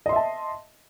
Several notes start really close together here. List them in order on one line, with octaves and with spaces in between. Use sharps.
D#5 C6 E5 A5